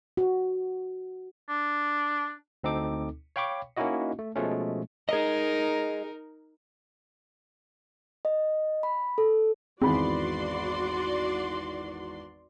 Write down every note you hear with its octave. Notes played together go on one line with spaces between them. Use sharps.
F#4
D4
D2 C4 D#4 A4 D6
C#5 F5 G5 B5 C#6 D6
A#3 C#4 D#4 E4 F#4 D#5
A3
B2 F3 G#3 A3 C#4
D#4 G#4 A#4 D#5
D#5
B5
A4
G#1 E2 C4 F#4 G#4 D5 B5 C6